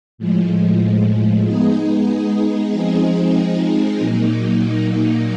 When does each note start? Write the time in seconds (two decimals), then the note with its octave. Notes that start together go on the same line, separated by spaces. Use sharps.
0.18 A2 F3 G#3
1.45 G#3 B3 D#4 G#4
2.70 F3 G#3 C4 D#4 G#4
3.96 A#2 F#3 A#3 D#4